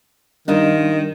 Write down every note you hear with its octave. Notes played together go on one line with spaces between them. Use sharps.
D#3 G3 D4 D#4 F4 D#5